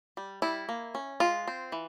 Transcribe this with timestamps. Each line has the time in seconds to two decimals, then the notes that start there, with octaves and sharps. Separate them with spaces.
0.17 G3
0.42 G3 E4
0.69 A#3
0.95 C#4
1.20 G#3 F4
1.47 C4
1.72 E3